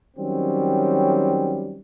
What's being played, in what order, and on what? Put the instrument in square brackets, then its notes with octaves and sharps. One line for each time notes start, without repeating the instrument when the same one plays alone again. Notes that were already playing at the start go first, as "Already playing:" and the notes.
[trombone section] D#3 F#3 G3 C4 C#4